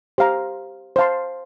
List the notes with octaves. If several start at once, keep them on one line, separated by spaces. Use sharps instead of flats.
G4 C5 F5 A#5
C5 F5 A5 C6